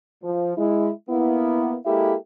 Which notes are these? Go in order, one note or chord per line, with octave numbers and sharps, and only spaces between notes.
F3
G#3 E4
A#3 B3 E4
G#3 A#3 E4 G4 A4 E5